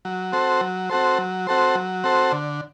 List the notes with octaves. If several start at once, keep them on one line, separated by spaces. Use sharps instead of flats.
F#3
C4 F#4 A4 C5
F#3
C4 F#4 A4 C5
F#3
C4 F#4 A4 C5
F#3
C4 F#4 A4 C5
D3